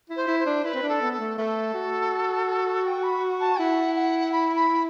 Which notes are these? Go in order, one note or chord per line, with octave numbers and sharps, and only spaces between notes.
E4
C5
E4
C5
D4
E4 B4
C4
D4
A4
B3
A4
A3
A3 A4 B4
F#4
G5
B5
A5
E4 F#5
F#5
B5
B5